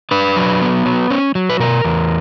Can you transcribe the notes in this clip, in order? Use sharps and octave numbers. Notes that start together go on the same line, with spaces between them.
D4 B4
F#3
B3
F#3
C#4
F#3
B4
B2 A#4
E2